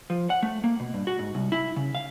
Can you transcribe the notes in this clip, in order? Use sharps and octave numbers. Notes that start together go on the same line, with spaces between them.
F3
F#5
A3
A#3
B2
G2
F#4
G#2
C2
E4
C#3
F5